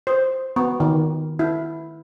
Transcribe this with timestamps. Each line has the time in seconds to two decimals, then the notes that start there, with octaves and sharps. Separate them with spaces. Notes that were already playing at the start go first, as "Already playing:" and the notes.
0.07 C5
0.56 B3
0.80 D#3
1.39 E4